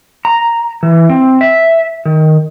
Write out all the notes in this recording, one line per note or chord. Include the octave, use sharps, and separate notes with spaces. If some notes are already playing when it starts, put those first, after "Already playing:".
A#5
E3
C4
E5
D#3